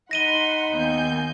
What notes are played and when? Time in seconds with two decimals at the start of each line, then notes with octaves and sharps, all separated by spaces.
0.11 D#4 F#5 B5 C6 A#6 D#7 G7
0.73 D#2 D#3 B3 G#5 G6